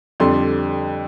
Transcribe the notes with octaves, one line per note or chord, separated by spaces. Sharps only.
F2 D3 G3 D4 C6